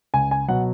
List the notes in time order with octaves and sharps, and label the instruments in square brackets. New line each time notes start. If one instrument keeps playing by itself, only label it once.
[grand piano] C#2 G#5
G#5
B2 F#3 F#5